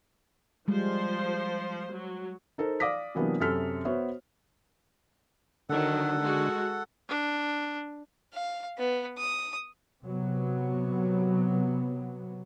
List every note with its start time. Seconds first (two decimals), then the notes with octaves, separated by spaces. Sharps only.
0.68 F3 G3 G#3 C5
1.93 F#3
2.58 D#4 A4 A#4 C5
2.80 D5 F5 D6 D#6 A#6 B6
3.15 C3 E3 F#3 A#3 B3 D4
3.40 F#2 C3 A4 F6 B6
3.85 B3 F#4 C5 C#5 E5
5.69 D3 D#3 F#3 A4 F#5
6.21 G#3 F#4
7.09 D4
8.33 F5
8.78 B3
9.18 D#6
10.04 C3 F#3 B3